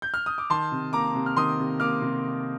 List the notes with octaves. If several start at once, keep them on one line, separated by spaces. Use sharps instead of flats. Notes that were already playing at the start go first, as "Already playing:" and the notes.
G6
F6
D#6
D6
D#3 A5 C6
C3
A#3 A#5 D6
C3
F6
D#3 C6 D#6
C3
A#3 D6 F6
C3